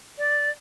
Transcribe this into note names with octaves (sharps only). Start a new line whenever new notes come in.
D5